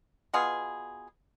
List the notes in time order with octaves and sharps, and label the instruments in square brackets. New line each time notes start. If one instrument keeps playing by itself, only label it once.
[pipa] B2 B3 F4 G#4